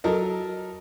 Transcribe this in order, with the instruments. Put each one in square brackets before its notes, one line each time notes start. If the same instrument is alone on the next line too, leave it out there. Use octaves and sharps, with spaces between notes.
[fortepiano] F#3 A4 A#4 D#5